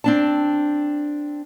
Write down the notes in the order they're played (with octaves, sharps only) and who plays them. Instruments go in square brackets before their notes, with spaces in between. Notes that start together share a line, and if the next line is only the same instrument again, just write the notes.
[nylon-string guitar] C4 D4 A5